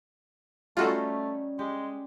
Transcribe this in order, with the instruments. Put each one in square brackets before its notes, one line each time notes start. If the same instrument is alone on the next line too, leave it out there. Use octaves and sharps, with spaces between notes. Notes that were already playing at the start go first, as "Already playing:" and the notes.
[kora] G3 C#4 D#4 [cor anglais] A3 [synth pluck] F4 F#4 A4
[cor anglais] G#3 [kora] G4